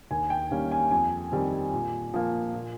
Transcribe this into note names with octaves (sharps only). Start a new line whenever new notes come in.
D#2 G#5
G5
D#3 G3 A#3 C#4 G#5
G#5
F2 G#5
D#3 G3 C4
A#2
F3 A#3
A#2